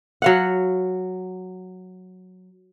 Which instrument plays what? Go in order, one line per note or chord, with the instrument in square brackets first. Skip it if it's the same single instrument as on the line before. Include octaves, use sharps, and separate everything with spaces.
[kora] F#3 F5 F#5